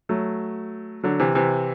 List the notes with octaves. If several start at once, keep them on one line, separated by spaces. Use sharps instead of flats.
F#3 A3
D3 F#3
C3 E3
C3 E3